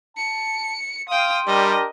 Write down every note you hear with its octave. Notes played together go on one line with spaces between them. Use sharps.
A5 C#7
F5 G5 C6 D#6
G3 D4 G4 A#4 D#5